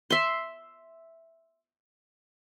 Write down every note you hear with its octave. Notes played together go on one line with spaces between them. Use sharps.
E5 C6